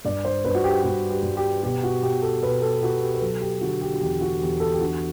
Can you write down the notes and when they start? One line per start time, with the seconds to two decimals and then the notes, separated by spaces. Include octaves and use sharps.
0.05 G2 D5
0.25 C5
0.45 G2 B4
0.55 F#4
0.64 G4
0.83 G2 G4
1.10 G4
1.23 G2
1.37 G4
1.63 B2 G4
1.83 F#4
2.03 B2 G4
2.22 A4
2.42 B2 B4
2.62 A4
2.82 B2 F#4
3.02 G4
3.14 B4
3.22 F#3 A4
3.41 G4
3.61 D3 F#4
3.81 G4
3.93 F#4
4.01 E2 G4
4.21 F#4
4.41 E2 G4
4.60 A4
4.73 G4
4.81 D4 F#4